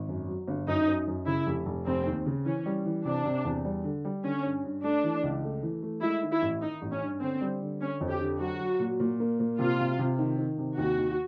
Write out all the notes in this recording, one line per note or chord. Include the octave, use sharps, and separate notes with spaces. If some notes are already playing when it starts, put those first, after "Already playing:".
Already playing: G#1
F#2
F#3
G1
F#2 D#4
F#2
F#2
C#3 E4
F1
F1
F1 C4
D#2
C#3
E3 C#4
G3
E3
C3 D4
C3
E2
G3
D3
G3
D3 C#4
G2
G2
A3 D4
E3
C#2
A3
E3
A3
G#3 E4
D#3
E4
A1
D#3 D#4
A1
C#4
G2
D3 C4
G3
D3
D3 C#4
F2
G4
D3
F#3 F#4
F#3
A#2
A#2
A#3
A#2
C3 F4
C3
C3
D#3
D#3
C3
D#2 F#4
D#2